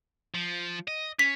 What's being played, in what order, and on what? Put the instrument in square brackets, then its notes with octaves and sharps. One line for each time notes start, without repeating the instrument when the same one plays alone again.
[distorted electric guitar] F3
D#5
[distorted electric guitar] C#4 [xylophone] B6